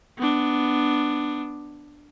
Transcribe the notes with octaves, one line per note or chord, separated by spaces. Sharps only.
B3 D4